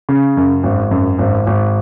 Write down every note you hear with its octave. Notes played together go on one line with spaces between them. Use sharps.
C#3
F#2
G#1
F#2
G#1
G#1